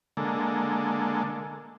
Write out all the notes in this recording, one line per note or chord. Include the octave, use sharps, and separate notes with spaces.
D3 G#3 A#3 A4